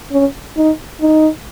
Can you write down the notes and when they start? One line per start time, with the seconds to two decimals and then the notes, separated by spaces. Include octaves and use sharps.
0.12 C#4
0.57 D#4
1.01 D#4